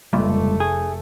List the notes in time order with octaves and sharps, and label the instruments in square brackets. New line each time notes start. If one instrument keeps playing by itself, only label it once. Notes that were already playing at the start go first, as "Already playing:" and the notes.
[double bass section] F1 A3 [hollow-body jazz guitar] C#2 G2 A#2
[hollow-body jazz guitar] G#4